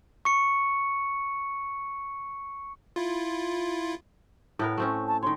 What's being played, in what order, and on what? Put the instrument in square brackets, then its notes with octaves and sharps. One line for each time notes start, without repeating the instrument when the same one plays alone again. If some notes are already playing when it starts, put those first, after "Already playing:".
[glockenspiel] C#6 C#7
[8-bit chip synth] E4 F4
[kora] A2 B3 A#4
A3 C4 C#4
[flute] A5
[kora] D#3 C#5 [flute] C6